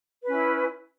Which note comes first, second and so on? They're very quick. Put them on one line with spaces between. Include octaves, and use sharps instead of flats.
B4 C#4 E4